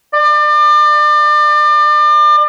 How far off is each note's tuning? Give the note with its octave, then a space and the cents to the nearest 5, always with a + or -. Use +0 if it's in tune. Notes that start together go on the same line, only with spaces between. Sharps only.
D5 +35